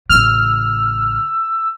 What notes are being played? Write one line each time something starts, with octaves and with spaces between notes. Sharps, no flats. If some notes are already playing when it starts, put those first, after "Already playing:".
A1 C#3 E6 F6